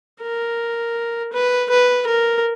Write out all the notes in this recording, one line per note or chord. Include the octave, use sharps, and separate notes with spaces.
A#4
B4
B4
A#4